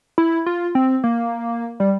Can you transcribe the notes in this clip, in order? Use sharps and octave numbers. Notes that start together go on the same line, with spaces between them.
E4
F4
C4
A#3
G3